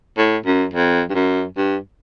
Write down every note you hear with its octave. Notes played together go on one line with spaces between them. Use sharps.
A2
F#2
F2
G2
F#2
G2